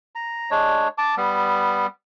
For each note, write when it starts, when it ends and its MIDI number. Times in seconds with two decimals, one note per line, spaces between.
0.15 0.50 82
0.51 0.88 56
0.51 0.88 62
0.51 0.88 73
0.98 1.15 81
0.98 1.15 86
1.17 1.86 55
1.17 1.86 59